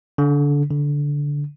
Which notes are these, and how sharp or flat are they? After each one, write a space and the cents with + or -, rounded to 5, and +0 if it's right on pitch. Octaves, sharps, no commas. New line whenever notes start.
D3 -25
D3 -15